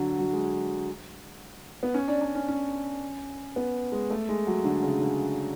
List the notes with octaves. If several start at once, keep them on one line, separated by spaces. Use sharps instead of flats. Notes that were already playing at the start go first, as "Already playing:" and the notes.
Already playing: D3 F#3
F#3
G#3
B3
C#4
D4
D4
C#4
C#4
B3
G#3
A3
G#3
F#3
D3
C#3
D3